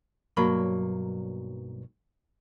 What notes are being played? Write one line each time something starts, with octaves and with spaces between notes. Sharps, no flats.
B1 G2 F#3 A#3 B5